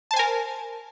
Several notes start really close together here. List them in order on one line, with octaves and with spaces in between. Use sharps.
A5 C5 G#5 A#4